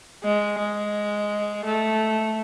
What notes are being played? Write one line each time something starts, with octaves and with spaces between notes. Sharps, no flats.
G#3
G#3
A3